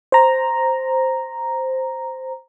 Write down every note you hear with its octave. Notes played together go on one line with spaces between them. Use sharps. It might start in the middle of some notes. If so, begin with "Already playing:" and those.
C5 A#5